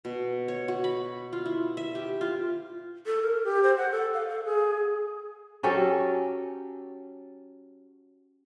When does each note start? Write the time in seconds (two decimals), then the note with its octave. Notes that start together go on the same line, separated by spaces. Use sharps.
0.05 B2
0.48 C#5
0.68 F#4
0.84 B5
1.33 F4
1.46 E4
1.77 E5
1.95 G4
2.21 F4
3.06 A4
3.22 A#4
3.44 G4
3.63 C5
3.77 F#5
3.91 A4
4.14 F5
4.28 A4
4.45 G#4
5.63 F#3 C#4 G4 A4